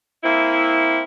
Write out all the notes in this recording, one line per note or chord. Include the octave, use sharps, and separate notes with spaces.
A#3 C4 E4